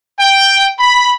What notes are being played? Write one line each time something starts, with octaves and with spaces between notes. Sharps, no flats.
G5
B5